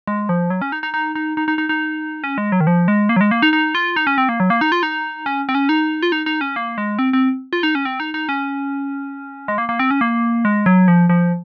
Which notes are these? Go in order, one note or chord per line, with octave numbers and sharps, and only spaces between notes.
G#3
F3
F#3
C#4
D#4
D#4
D#4
D#4
D#4
D#4
D#4
D#4
C#4
G#3
F#3
D#3
F3
G#3
A#3
F#3
G#3
A#3
D#4
D#4
F4
D#4
C#4
C4
A#3
F#3
A#3
D#4
F4
D#4
C#4
C4
C#4
D#4
F4
D#4
D#4
C#4
A#3
G#3
C4
C4
F4
D#4
C#4
C4
D#4
D#4
C#4
G#3
A#3
A#3
C4
C#4
A#3
G#3
F#3
F3
F3